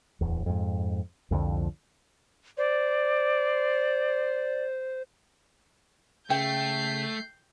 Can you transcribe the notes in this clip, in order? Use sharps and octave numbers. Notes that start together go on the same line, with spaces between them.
D1 E2
F2 G#2
C2 F2 D3 F3
C5 D5
C#3 A3 G5 G6 C7